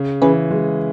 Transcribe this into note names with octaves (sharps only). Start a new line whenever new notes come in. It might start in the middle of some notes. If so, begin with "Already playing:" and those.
Already playing: C#3
E3 C#4 G#4 B4
F#3 G#3